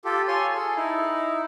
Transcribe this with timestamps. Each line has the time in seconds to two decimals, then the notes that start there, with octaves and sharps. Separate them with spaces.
0.05 F4 G4 A4
0.28 F4 C#5 G#5 C6
0.55 G#4 A4
0.76 D#4 E4